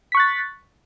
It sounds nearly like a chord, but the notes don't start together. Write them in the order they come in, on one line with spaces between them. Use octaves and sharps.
B6 C#6 F#6 A6